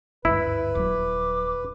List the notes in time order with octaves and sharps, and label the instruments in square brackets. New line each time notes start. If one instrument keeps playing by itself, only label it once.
[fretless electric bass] G#1 D2 G2 [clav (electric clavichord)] E4 [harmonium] B4
[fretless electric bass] D#1 F#3 [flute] D6